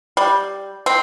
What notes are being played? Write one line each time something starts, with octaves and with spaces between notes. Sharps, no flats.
G3
C4